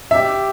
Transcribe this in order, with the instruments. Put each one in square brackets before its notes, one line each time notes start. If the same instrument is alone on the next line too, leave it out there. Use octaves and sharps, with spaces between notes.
[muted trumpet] G4 [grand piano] E5